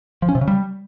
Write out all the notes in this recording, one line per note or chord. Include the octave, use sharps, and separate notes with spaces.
F3
C#4
C3
C#3
G3